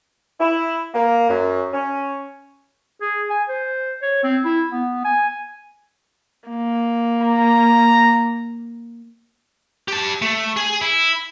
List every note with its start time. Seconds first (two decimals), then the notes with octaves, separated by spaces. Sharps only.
0.40 E4
0.94 A#3
1.29 F#2
1.73 C#4
3.01 G#4
3.30 G#5
3.49 C5
4.02 C#5
4.23 C4
4.44 E4
4.71 B3
5.04 G#5
6.49 A#3
7.22 A#5
9.88 G4 A5
10.22 A3
10.57 G#4
10.81 E4